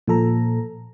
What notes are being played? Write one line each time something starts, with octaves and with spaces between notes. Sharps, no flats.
A#2 F3 A4 A#5